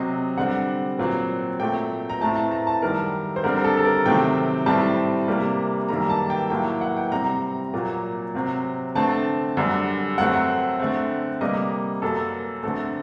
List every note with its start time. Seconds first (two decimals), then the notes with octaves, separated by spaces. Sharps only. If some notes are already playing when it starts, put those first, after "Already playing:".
Already playing: C3 F#3 C4 D#5
0.37 D3 G3 C4 F#5
0.98 A#2 F#3 C4
1.59 A#2 F#3 A3 C4 G5
2.09 A#5
2.21 A2 A3 C4 A5
2.36 A5
2.52 A#5
2.67 A5
2.82 F#2 D#3 G3 A#4
3.36 C5
3.44 D3 G3 C4 A#4
3.64 A4
3.77 A4
3.85 A#4
4.05 C3 D#3 F#3 A3 C4 G5
4.66 A2 G3 C4 A5
5.28 C3 G3 A#3
5.88 F#2 D#3 G3 A#3 A#5
6.10 A5
6.30 G5
6.50 A2 F#3 A#3 G5
6.81 F#5
6.97 G5
7.12 C3 G3 C4 A#5
7.73 A#2 F#3 A#3
8.34 C3 F#3 C4
8.95 D3 A3 C4 A5
9.57 F#2 D3 G3
10.18 F#2 F#3 A3 C4 F#5
10.80 D3 A3 C4
11.41 C3 G3 A#3 D#5
12.02 F#2 F#3 A#3 A4
12.63 D3 A3 C4 A4